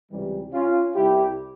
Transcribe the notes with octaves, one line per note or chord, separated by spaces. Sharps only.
C#2 C3 E3 G3
C#4 F4
C2 C3 G3 E4 G4